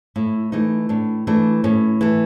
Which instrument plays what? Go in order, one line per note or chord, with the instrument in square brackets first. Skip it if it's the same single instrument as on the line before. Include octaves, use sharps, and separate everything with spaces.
[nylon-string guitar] A2 E4
E3 A3 D#4
A2 D4
E3 A3 D4
A2 C#4
E3 A3